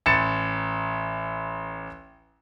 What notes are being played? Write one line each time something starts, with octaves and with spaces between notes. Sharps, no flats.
A1 A6 C#7 E7